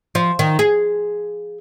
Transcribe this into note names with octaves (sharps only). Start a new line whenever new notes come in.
F3
D#3
G#4